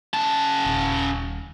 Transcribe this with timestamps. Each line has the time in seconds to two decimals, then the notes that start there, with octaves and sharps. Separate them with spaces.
0.14 C#3 A5
0.65 D#1